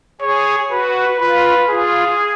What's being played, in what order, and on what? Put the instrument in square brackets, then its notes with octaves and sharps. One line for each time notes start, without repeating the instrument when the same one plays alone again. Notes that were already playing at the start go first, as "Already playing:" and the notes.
[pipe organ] G#4 [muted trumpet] C#5
[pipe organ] F#4 [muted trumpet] B4
[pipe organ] F4 [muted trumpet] B4
[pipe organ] F4 [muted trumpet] G#4